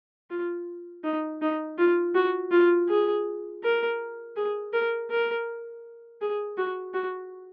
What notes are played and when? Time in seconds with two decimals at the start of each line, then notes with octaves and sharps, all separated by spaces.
0.30 F4
1.04 D#4
1.41 D#4
1.78 F4
2.15 F#4
2.51 F4
2.89 G#4
3.63 A#4
4.36 G#4
4.73 A#4
5.10 A#4
6.21 G#4
6.57 F#4
6.94 F#4